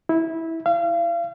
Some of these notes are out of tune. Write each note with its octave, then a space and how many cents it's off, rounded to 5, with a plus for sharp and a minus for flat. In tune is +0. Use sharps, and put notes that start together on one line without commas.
E4 -15
F5 -35